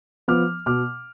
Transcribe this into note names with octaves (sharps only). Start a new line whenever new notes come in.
F3 B3 D6 F6
B2 D6 F6